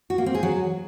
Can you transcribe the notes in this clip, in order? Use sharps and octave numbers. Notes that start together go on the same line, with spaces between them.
F#4
A#3
C4
G#4
F#3